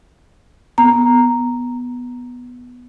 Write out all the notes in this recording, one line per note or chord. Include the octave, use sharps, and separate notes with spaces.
B3 A#5